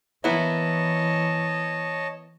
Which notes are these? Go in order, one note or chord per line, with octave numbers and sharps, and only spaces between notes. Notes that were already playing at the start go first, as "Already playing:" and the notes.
E3 A#3 B3 E4 C#5 D#5 A5